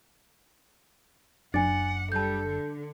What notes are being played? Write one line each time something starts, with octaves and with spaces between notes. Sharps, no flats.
F#1 D4 F#5 G#5 A6
G3 A4 A5 G6
D3